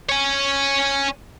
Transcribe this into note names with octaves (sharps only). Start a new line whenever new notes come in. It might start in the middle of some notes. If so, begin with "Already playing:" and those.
C#5 G#5